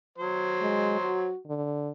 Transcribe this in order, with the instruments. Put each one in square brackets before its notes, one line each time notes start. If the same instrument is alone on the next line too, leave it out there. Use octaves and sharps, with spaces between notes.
[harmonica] F#3 C5
[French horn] G#3
F#4
D3